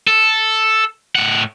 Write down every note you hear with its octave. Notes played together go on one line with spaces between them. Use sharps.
A4
A2 F#5